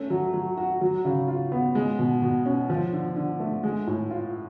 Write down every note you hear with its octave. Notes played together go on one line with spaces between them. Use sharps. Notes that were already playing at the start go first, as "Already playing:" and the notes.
Already playing: A3 C#4
F#3
F#3
F#4
F#3
C#3
F4
B3
G#3
B2
B2
C#4
F3
D3
D3
A3
G#3
A2
F4